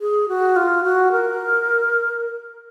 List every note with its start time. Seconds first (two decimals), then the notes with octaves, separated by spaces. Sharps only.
0.01 G#4
0.29 F#4
0.56 F4
0.84 F#4
1.12 A#4